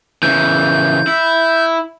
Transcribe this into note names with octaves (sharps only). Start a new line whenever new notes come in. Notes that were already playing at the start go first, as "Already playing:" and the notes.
C#3 E3 G6
E4